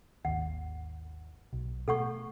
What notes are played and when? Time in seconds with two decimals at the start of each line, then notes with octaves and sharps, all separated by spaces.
0.25 G#1 D#2 F#5
1.53 B1
1.88 B2 A3 A4 F#5 C#6